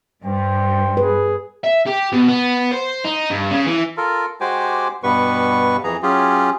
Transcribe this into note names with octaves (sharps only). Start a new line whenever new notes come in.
G2 C5 G5
G#4 B4
E5
G4
B2
B3
C5
D#4
G2
C#3
E3
F4 A4 A#4
G#3 F#4 G4 C5 G#5 D6
G2 B2 G3 B3 B4 C#6
F2 E3 G#4 A#5
F#3 C#4 F4 G4 G#4